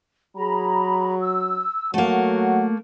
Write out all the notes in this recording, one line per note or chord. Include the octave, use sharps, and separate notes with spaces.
F#3 G#4 A#5 B5
E6
F#3 A3 A#3 F#5